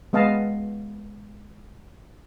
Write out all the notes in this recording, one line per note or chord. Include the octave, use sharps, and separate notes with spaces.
G#3 B3 D#5 F5 A5